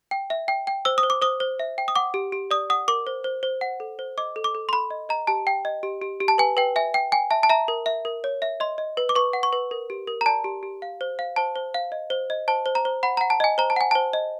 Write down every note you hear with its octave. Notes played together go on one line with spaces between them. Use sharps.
G5
E5
G5
G5
C5 E6
D#6
C5
D6
C5 D#6
C5
E5
G5
D#6
F#5 D6
G4
G4
D5 D#6
F#5 D#6
A#4 D6
C5
C5
C5
F#5
A4
C5
D#5 D6
A4
D6
A4
C6
A4 B5
D#5
D#5 A#5
G4 A5
G5
D#5
G4
G4
G4
A5
B4 G#5
B4 G5
E5 G#5
G5
G5 G#5
E5 A5
A5
E5 A#5
A#4
E5
A#4
C#5
E5
D#5 C6
D#5
B4
D6
B4 C#6
F#5
C#6
B4
A#4
G4
A#4
A#5
D5 A5
G4
G4
F5
C5
F5
C5 A5
C5
F5
D#5
C5
D#5
C5 A5
C5
A#5
C5
F#5 B5
F#5 A#5
A5
D#5 G#5
C5 A#5
A5
F#5 G#5
C5 A5
D#5